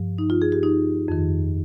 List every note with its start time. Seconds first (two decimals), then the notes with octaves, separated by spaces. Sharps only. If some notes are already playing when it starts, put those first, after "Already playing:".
Already playing: G2 F3
0.18 D#4
0.30 F4
0.42 G#4
0.52 G4
0.63 D#4
1.08 F2 D#3